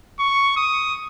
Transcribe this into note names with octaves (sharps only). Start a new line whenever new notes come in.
C#6
D#6